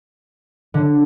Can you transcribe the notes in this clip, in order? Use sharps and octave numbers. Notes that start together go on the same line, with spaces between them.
D3